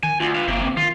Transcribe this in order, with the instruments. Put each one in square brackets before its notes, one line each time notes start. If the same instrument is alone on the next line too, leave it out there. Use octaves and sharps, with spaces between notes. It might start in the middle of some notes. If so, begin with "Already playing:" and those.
[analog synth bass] D#3 [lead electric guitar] G#5
[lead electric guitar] D2 [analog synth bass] F4
[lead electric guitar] B4 F5
[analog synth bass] G1 [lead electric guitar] C3 A#3
[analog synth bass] C4
[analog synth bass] D#3 [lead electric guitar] F4